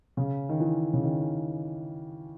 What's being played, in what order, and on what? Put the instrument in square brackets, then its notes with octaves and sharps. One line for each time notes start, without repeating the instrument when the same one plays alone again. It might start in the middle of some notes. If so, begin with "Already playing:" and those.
[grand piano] C#3
D#3
E3
C#3
D#3